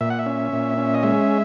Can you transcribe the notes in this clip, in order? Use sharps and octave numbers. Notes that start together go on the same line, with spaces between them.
A#2 E5
F#5
E5
C#4
A#2
C#4
D#5
G#3 E5